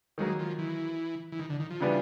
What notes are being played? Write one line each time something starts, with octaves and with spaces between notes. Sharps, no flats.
D#3 F#3 G#3 A#3
F3
E3
E3
D#3
D3
D#3
F3
C#3 E3 G3 B3 D4